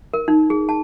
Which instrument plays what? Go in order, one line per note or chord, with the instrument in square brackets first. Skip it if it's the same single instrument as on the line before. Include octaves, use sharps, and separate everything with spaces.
[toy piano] A#4
D#4
G#4
A5